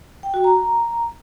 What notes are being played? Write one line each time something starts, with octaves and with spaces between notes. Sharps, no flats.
G5
F#4
A#5